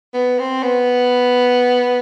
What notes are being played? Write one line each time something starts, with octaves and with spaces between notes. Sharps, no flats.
B3
C4
B3